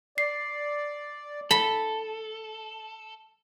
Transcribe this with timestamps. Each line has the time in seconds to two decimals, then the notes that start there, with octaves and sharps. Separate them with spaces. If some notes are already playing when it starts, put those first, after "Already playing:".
0.18 D5 C7
1.51 A4 B5